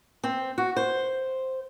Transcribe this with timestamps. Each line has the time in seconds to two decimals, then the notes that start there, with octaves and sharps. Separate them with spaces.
0.24 C4
0.58 F#4
0.76 C5